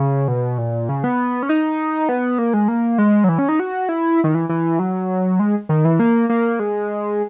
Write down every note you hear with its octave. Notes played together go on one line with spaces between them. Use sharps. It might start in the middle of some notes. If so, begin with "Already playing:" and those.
Already playing: C#3
B2
A#2
C#3
B3
C#4
D#4
B3
A#3
G#3
A#3
G#3
F#3
E3
C#4
D#4
F#4
E4
D#3
E3
E3
F#3
G#3
D#3
E3
A#3
A#3
G#3